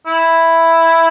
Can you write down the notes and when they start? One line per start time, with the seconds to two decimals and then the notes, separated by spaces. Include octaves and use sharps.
0.06 E4